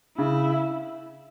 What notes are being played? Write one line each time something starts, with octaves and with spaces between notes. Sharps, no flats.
C#3 E4